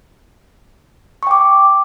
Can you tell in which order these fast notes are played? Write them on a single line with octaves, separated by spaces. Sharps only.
C#6 G5 D6